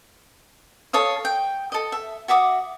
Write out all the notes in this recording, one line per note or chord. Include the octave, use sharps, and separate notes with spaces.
A4 C#5 F5 D#6
G5
A4 D#5
E5
F#4 E5 D6 D#6